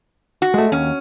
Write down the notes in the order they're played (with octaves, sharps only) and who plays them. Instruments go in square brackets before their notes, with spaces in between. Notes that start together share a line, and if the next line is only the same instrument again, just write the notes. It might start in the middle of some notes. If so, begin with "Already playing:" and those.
[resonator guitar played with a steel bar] F#4
[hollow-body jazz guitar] G#3 A3
[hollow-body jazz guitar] D#2 [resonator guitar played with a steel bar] C#4